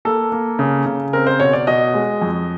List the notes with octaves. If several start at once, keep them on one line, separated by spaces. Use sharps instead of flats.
A#3 A4
A#3
C#3
C#3
C4 A#4
C5
B2 C#5
D5
B2 D#5
G#3
F2